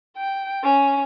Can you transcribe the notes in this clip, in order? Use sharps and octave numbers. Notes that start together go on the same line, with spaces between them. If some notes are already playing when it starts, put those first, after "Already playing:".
G5
C#4